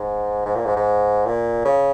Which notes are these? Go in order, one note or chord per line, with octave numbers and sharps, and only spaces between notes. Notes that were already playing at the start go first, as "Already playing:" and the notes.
Already playing: G#2
G#2
A#2
G#2
G#2
A#2
C#3